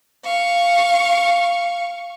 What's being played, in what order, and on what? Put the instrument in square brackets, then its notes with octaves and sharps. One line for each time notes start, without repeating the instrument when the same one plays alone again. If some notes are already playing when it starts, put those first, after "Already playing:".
[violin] F5 C#6